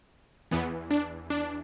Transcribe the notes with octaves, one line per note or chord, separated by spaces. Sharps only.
E2 E3 B3
D4
D4